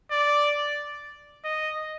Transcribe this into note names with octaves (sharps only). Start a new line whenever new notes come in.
D5
D#5